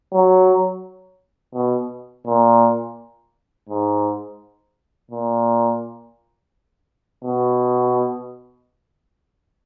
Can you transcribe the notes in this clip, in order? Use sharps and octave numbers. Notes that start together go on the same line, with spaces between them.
F#3
B2
A#2
G#2
A#2
B2